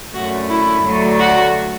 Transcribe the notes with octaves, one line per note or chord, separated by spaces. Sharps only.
F#2 D3 A3 C#4 F#4
E4
D2 D3 F#3 A3
F#4